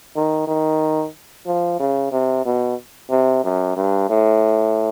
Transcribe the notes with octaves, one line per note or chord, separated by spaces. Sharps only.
D#3
D#3
F3
C#3
C3
B2
C3
F#2
G2
A2